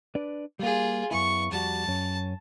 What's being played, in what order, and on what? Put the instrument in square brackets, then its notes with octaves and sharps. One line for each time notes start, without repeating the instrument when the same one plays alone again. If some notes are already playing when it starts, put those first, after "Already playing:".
[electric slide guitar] D4 B4 D5
[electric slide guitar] G3 A#3 [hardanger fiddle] F4 G#4
[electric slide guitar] F#2 B3 E4 [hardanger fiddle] C#6
[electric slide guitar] F2 G3 F#4 [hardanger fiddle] A5
[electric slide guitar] F#2 C#4